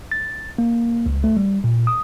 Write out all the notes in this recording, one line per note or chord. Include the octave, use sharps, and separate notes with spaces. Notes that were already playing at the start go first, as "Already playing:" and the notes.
A6
A#3
C#2
A3
G3
A#2
D#6